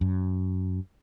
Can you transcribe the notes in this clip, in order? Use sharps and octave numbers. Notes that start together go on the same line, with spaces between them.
F#2